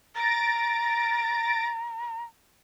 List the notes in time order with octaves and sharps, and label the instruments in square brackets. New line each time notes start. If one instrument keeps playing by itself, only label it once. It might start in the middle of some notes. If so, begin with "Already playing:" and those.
[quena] A#5 [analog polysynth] A6 A#6 D7